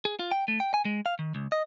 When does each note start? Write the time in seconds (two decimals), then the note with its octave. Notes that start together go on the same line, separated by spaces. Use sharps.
0.05 G#4
0.19 F4
0.31 G5
0.48 A3
0.60 G5
0.74 G#5
0.85 G#3
1.06 F5
1.19 D#3
1.35 C#2
1.52 D#5